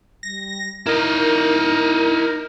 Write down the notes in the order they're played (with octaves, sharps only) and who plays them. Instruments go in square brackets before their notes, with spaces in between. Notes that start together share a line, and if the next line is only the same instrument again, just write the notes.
[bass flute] G3 [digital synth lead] A#6
[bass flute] D#4 [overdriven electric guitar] E4 D#5 [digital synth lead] A#4